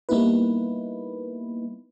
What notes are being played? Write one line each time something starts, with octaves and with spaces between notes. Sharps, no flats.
G3 A#3 B3 D#4 E4 B4